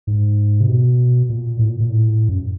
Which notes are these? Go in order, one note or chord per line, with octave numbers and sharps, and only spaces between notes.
G#2
C3
B2
A#2
A2
A#2
A#2
A2
F#2